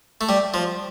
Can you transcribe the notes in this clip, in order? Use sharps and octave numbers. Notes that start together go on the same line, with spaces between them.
A3
G3
F3